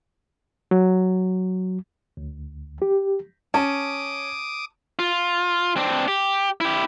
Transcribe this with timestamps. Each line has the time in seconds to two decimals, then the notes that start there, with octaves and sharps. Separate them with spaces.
0.71 F#3
2.17 D2
2.82 G4
3.54 C#4 A5 D6 D#6
4.99 F4
5.77 C4 D4
6.08 G4
6.61 E4 G4